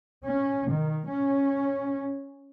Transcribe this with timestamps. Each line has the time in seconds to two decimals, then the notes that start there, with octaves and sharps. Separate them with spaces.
0.24 C#4
0.72 D#3
1.09 C#4